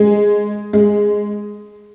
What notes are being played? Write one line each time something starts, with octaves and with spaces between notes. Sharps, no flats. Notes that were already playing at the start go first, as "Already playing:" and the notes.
Already playing: G#3
G#3